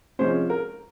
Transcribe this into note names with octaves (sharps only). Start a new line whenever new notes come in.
C3 F3 G#3 C#4 C5
A#4